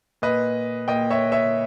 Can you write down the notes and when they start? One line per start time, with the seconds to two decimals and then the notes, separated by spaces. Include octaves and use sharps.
0.22 A#2 B4 D#5
0.88 A#2 D#5 G5
1.10 C#5 E5
1.32 C#5 E5